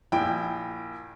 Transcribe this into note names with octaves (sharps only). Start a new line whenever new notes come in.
A#1 E4 G5